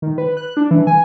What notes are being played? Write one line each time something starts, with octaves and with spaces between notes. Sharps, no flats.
D#3
B4
F#6
D4
E3
G#5